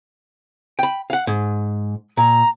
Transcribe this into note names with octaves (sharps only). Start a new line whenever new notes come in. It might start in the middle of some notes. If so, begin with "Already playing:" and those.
G5 B5
F5 F#5
G#2
A#2 A#5